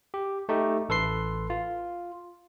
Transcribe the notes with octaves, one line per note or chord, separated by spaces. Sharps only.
G4
A3 D#4 G4 A4
A1 A4 B4 C6 C7
F4